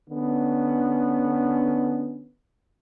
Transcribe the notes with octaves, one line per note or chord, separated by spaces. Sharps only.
D3 B3 C#4